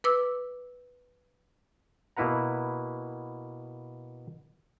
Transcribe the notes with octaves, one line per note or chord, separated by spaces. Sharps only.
B4 D6 E6
B2 A#3 E4 B4 F#5 A#5